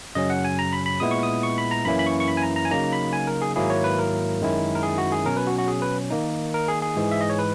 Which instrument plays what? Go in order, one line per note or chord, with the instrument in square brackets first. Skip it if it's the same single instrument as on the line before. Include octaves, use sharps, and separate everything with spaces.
[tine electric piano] F#2 C#3 F#3 C#4 D#5
F#5
G#5
A#5
B5
B5
A#2 G#3 B3 E4 D#6
C#6
D#6
C#6
B5
A#5
F#2 E3 A#3 C#4 E4 B5
B5
C#6
C#6
B5
G#5
A#5
A#5
G#5
C#3 F#3 A#3 D#4 A#5
B5
G#5
A#4
G#4
G#2 D#3 F#3 A#3 E4 G#4
C#5
B4
A#4
F#2 D#3 G#3 C#4 E4
A#4
G#4
F#4
G#4
B2 F#3 C#4 A#4
B4
F#4
F#4
G#4
B4
D#3 A#3 D#4
A#4
G#4
G#4
G#2 E3 G#3
E5
D#5
C#5
B4